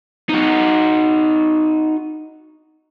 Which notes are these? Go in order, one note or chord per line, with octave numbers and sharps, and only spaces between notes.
D#4 F#4